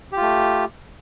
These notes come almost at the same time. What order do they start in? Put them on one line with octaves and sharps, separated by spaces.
G4 F4 A3